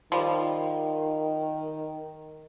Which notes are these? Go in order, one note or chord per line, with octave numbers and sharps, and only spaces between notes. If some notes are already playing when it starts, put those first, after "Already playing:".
D#3 F3 G3